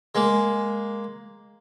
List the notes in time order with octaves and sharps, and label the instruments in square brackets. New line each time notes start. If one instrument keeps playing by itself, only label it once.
[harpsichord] G#3 A#3